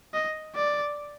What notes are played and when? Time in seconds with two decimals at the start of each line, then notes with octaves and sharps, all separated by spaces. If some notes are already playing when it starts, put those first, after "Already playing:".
0.14 D#5
0.56 D5